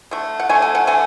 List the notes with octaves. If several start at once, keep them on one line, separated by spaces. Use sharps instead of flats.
D3 A3
F#5
D3 A3 G#5
G#5
F#5
D3 A3 G#5